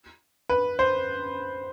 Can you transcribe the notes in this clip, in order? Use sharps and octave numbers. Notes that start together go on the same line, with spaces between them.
B4
C5